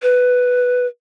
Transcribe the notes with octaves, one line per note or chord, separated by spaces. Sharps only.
B4